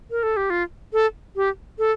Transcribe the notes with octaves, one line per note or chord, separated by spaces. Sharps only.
A#4
A4
G4
F4
A4
G4
A4